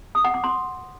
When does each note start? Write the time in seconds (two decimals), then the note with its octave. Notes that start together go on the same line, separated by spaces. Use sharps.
0.15 D#6
0.24 F#5
0.34 D6
0.44 C6